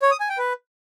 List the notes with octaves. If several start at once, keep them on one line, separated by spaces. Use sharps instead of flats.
C#5
D#6
G#5
G5
B4